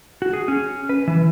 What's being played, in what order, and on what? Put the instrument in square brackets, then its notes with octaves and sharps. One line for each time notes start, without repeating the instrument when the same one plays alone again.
[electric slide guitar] F#4
G#4
C#4
B4
E3